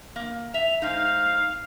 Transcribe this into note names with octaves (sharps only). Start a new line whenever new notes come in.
A#3
E5 F7
G#2 D#4 F5